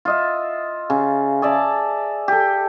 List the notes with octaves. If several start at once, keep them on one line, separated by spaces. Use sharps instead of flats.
F4 D#5 E5
C#3
G#4 D5 E5 A5
G4 A4